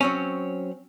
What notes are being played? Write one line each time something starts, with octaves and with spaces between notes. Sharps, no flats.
F#3 C4 C#4